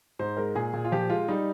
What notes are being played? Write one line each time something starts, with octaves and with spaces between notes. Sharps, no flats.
G#2 C5
G#3 A#4
A#2 G#4
A#2
F4
F3 G4
G#3 F4
G3 D#4